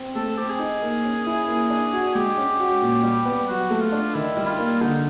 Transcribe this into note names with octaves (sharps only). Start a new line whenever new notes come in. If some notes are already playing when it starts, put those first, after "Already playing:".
Already playing: C4
A3 A4
C4 G4
G#4
D#4
A#3
C#4
E4
A#3
D4
F#4
G#3 G4
C#4
F#4
A#2
G3
B3
F#3 F#4
A3
F4
D4
D#3 E4
G3
F4
A#3
D3 D#4